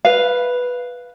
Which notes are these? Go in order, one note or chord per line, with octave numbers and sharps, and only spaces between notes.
B4 F5